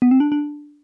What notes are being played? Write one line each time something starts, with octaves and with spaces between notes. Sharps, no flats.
B3
C4
D4
D4